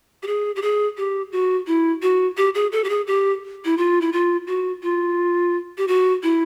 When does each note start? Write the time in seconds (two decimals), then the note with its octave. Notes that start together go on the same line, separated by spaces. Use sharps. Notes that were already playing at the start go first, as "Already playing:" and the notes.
0.23 G4
0.27 G#4
0.56 G4
0.62 G#4
0.97 G4
1.32 F#4
1.67 E4
2.02 F#4
2.37 G4
2.55 G#4
2.72 A4
2.84 G4
2.89 G#4
3.07 G4
3.65 E4
3.78 F4
4.01 E4
4.13 F4
4.47 F#4
4.83 F4
5.78 G4
5.88 F#4
6.23 E4